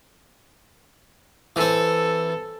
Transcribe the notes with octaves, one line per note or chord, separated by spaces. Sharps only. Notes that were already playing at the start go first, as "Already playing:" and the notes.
E3 C4 A4